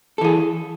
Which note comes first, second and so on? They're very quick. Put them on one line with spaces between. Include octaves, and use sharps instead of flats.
A4 E3 G#4